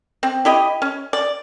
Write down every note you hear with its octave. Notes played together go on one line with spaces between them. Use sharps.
C4
E4 G4 D#5
C#4
D5